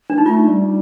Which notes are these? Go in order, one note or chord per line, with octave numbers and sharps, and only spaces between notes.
D4
D#4
A3 F4
G3